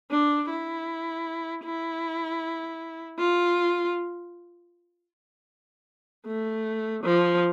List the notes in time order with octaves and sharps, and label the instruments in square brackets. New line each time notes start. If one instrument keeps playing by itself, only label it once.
[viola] D4
E4
E4
F4
A3
F3